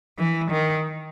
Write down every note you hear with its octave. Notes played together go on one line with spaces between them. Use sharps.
E3
D#3